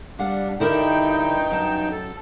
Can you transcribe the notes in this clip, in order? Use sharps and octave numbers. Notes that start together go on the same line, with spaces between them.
G3 D4 F5 F#5
G2 D3 D#4 E4 A#4 G5
F#2 A5
A4